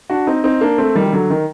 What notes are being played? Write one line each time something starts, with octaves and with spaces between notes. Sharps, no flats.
D4 F#4
C4 D#4
C4 D#4
A#3 D4
A3 C4
D#3 G3
D#3
D3 F#3
D#3